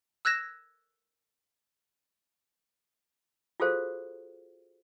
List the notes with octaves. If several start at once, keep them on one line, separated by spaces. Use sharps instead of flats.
E6 F#6 G#6 A#6 E7
F4 F#4 G#4 A4 C5 F5